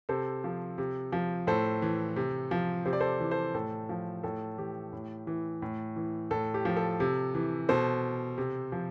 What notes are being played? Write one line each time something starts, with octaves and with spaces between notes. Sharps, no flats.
C3 A4 C5
F3
C3
F3
A2 A4 C5
E3
C3
F3
C3 C5
D5
A4 C5
E3
A4 C5
A2 A4
F3
A2 A4
E3 G4
A2
E3
A2
E3
A2 A4
G4
F3
A4
C3
E3
B2 A4 C5
C3
F3